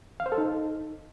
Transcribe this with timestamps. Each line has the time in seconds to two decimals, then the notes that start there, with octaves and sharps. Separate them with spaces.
0.20 F5
0.26 C5
0.32 A4
0.38 D#4